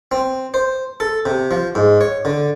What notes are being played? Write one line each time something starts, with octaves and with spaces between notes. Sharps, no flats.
C4
C5
A4
C3
F3
G#2
C#5
D3